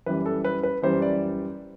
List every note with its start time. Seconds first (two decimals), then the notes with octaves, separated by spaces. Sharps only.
0.06 F#2 E3 G3 B4
0.26 A4
0.44 B4
0.63 B4
0.82 F#2 E3 G3 C5
1.02 D5